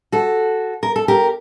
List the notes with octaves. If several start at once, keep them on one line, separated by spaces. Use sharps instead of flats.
F#4 A4
A#4
A4
G4 A#4